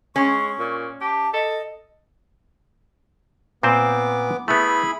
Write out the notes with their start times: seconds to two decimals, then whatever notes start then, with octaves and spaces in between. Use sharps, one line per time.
0.16 G#3 C#4 C#6
0.59 A#2
1.01 G4 A5
1.34 A4 D#5
3.63 A#2 B3 C4 C5 D6
4.48 A3 B3 E4 G#4 B5